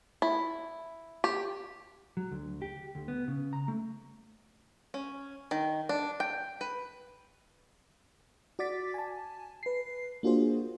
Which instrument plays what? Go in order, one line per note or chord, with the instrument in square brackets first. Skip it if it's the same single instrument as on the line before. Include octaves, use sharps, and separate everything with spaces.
[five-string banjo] E4
G4
[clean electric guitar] F#3
D2
G4
D2
B3
C#3
A#5
A3
[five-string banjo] C#4
D#3
D4
G5
B4
[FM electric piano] F#4 D5 D6 A6 B6
G#5 A5
B4 C7
A#3 D4 F4 F#4 G#4 C5